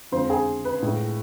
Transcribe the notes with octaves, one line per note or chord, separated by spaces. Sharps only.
F2 D3 F3 G#3 C5
G#4
B4
A2 F3 G#3